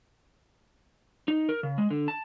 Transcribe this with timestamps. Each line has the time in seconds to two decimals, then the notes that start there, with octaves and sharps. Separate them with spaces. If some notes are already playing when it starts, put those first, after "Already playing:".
1.28 D#4
1.49 A#4
1.63 C#3
1.78 G#3
1.90 D3
2.08 A5